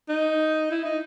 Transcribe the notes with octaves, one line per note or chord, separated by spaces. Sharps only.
D#4
E4
D#4